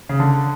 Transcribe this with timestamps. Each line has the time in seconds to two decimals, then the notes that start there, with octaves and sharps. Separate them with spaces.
0.09 C#3
0.20 D3